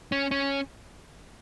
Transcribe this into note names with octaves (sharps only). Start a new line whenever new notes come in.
C#4
C#4